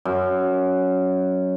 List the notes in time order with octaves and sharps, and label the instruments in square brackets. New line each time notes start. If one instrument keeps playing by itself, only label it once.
[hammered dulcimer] F#2